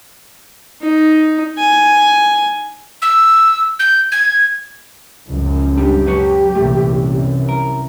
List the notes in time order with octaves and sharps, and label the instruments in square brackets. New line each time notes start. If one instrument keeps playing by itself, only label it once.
[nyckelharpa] D#4
G#5
[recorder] E6
G6
G#6
[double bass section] C#2 F#2 F3
[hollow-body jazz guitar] G3 D4 [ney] G4
[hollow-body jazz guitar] F#3 B4 C#5
[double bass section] C2 F#2 E3 [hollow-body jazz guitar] A#2 A3
[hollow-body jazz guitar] A#4